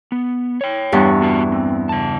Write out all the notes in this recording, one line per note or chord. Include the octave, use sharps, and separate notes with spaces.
B3
C#5 G5
E2 G2 C#6
B3 F#4 A5
C4
C#3 A5